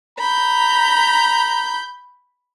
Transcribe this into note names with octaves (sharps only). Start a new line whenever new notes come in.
A#5 B5 G6